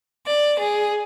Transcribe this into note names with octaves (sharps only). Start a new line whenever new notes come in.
D5
G#4